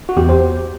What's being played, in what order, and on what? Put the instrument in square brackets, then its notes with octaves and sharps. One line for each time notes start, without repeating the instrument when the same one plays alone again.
[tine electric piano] F#4
E2 G4
C5